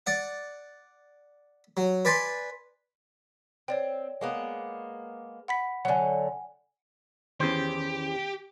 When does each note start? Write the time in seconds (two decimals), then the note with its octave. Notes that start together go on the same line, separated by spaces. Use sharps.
0.07 D5 F#5
1.77 F#3
2.05 B4 D5 G#5 B5 C6
3.68 C4 C#5 D5 G5
4.21 G#3 A#3 B3
5.48 F#5 B5 B6
5.85 D3 F#3 F#5 G#5
7.40 E2 D#3 C#4 G4 C5